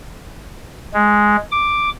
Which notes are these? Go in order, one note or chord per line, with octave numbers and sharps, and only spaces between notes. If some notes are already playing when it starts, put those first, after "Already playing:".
G#3
D6